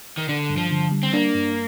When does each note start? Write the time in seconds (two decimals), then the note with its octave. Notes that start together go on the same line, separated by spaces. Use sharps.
0.17 D#3
0.29 D3 D4
0.50 G2
0.57 F3
0.71 D3
0.92 G3
1.03 C4
1.13 A#3 D4
1.35 G2